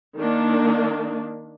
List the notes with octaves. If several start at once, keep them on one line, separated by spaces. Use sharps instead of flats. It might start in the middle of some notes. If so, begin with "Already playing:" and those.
D#3 A#3 D4